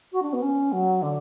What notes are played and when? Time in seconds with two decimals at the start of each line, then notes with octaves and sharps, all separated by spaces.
0.12 F#4
0.22 D4
0.33 B3
0.42 C#4
0.72 F#3
1.02 D3